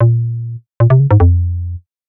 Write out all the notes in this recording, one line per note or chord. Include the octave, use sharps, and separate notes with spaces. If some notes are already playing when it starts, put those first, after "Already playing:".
A#2
A#2
C3
C#3
G#2
F2